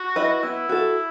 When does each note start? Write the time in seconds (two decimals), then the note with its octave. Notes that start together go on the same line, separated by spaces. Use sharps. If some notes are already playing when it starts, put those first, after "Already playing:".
Already playing: F#4
0.16 E4 B4 D#5
0.43 B3 E4
0.69 F#4 A4